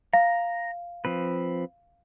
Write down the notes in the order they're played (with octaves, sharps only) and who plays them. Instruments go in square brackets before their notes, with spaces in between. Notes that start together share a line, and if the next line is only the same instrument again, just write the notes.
[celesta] F5 [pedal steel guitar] A#5
[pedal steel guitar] F3 C4 B4